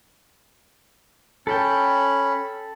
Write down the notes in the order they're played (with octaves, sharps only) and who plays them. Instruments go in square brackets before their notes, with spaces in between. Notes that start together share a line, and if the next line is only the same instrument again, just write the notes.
[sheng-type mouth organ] C#4 B5 [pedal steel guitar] A4 G5